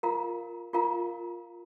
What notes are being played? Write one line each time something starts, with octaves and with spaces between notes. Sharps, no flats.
F4 A#4 F5 A#5
F4 A#4 F5 A#5